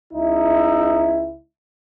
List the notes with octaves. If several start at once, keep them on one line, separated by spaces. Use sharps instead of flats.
C#2 D#4 E4